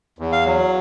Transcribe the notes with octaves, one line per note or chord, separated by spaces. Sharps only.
E2
F5
F#3